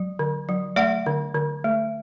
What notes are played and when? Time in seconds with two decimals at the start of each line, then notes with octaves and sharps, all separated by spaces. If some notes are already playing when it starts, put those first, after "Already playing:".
Already playing: F#3
0.19 D3
0.49 F#3
0.76 A3 D5 F#5
1.06 D3
1.35 D3
1.64 A3